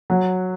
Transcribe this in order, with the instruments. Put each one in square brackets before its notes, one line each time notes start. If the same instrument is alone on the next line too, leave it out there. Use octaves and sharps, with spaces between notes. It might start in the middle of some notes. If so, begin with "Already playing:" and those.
[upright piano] F#3